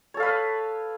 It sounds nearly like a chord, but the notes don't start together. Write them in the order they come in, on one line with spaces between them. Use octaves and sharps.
C#5 A4 F5 B4